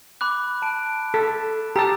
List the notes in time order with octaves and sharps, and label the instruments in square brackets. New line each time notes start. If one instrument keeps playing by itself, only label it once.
[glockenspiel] B5 D6 F#6
A5 D7
[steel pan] A4
[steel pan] G4 A5 [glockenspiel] A#5 E6